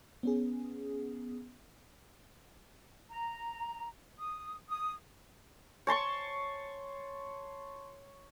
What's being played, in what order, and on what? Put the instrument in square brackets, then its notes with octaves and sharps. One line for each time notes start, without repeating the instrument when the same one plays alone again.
[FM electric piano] B3 C#4 G#4
[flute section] A#5
D#6
D#6
[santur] C#5 A5 C6 C#6